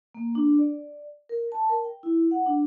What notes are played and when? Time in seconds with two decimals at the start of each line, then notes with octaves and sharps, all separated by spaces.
0.15 A#3
0.35 D4
0.59 D5
1.29 A#4
1.52 A5
1.69 A#4
1.84 G5
2.03 E4
2.31 F#5
2.46 D4